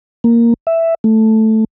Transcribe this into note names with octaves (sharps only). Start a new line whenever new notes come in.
A#3
E5
A3